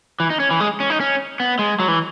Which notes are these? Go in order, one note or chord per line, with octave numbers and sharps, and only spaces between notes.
E3
D#4
C#4
E3
G#3
C#4
D#4
C#4
B3
G#3
F#3
E3